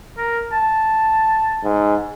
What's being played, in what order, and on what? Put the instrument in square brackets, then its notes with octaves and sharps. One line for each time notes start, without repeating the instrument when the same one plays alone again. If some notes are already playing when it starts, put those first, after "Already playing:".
[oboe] A#4
A5
[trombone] G#2